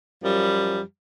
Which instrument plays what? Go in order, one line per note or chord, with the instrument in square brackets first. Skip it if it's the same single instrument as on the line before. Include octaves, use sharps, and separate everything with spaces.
[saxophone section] F#2 F3 G3